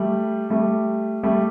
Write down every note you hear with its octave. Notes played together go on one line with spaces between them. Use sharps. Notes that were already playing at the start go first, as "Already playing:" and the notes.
Already playing: G3 A3
G3 A3
G3 A3